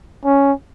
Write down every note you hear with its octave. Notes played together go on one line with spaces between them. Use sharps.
C#4